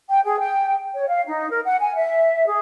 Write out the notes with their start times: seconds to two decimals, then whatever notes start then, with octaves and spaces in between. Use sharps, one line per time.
0.09 G5
0.24 G#4
0.39 G5
0.94 C#5
1.08 F5
1.27 D#4
1.51 A#4
1.65 F#5
1.79 G#5
1.95 E5
2.47 G#4